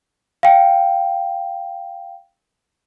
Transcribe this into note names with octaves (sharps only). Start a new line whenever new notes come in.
F5 G5